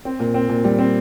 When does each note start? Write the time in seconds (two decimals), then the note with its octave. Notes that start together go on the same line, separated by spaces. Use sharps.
0.05 C4
0.20 A#2
0.34 C4
0.49 A#2
0.64 G3
0.79 C4